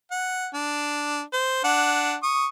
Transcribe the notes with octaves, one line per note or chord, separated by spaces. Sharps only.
F#5
D4
C5
D4 F#5
C#6 D#6